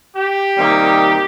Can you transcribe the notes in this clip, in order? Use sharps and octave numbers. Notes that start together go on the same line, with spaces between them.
G4
C3 D#3 G3 A#3 D#4